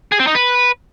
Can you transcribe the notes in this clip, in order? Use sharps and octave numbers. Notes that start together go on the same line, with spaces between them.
G#4
C4
D#4
B4